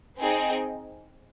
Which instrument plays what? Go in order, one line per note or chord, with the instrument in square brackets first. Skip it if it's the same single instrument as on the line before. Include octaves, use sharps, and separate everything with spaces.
[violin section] C4 D#4 G#4 D#5